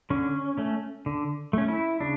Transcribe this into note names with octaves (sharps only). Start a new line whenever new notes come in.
D3 C#4
A3 C#4
D3
A3 C#4
E4
C#3 D4